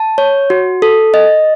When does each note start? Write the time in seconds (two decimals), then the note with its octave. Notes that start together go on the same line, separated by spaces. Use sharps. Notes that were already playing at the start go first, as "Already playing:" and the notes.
Already playing: A5
0.18 C#5
0.50 F#4
0.82 A4
1.14 D#5